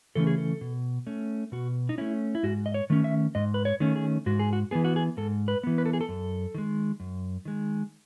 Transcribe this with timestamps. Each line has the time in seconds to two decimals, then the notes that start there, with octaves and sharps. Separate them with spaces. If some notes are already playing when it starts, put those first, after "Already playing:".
0.15 C#3 E3 A3 C#4 A4
0.27 G#4
0.38 A4
0.61 B2
1.07 A3 C#4
1.52 B2 F#4
1.89 D#4
1.98 A3 C#4 E4
2.35 E4
2.43 G#2 F#4
2.66 D#5
2.74 C#5
2.90 D#3 A3 C#4
3.04 E5
3.35 G#2 D#5
3.54 B4
3.65 C#5
3.80 D#3 A3 C#4
3.96 G#4
4.26 G#2 F#4
4.39 G#4
4.53 F#4
4.71 E3 B3 G#4
4.84 F#4
4.96 G#4
5.17 G#2 A4
5.48 B4
5.63 E3 B3
5.78 B4
5.86 A4
5.93 G#4
6.01 A4
6.09 F#2
6.55 D#3 G#3
7.00 F#2
7.45 D#3 G#3